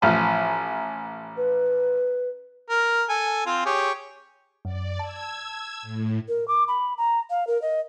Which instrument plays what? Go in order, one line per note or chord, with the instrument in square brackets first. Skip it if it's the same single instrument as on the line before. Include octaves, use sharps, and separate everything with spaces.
[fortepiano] A1 F3 F6 [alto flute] G#5
[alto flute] B4
[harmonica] A#4
A4 G#5
C4 F4 C5
G4 G#4 C#5
[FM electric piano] F#2 [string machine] D5
[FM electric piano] A5 [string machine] E6 G#6
[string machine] A2
[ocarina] A#4
D6
B5
A#5
F5
A#4
D#5